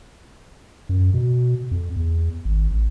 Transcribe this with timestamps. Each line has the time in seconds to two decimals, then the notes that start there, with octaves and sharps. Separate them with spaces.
0.89 F#2
1.14 B2
1.71 F2
1.96 E2
2.45 G#1
2.71 A1